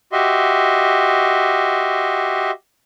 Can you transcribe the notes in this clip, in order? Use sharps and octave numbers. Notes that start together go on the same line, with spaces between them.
F#4 G4 D#5 E5 C6